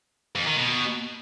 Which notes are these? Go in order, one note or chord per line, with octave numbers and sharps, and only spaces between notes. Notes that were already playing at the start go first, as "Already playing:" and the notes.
F2
D#3
B2